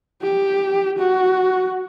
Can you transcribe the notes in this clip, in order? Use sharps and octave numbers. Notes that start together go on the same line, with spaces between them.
G4
F#4